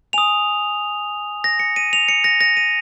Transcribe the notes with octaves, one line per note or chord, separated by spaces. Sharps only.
G#5 D#6 F7
A#6
C#7
D#7
F7
C#7
A#6
A#6
D#7